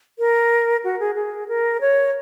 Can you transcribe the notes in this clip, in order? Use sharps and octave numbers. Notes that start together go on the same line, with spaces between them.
A#4
F#4
G#4
G#4
A#4
C#5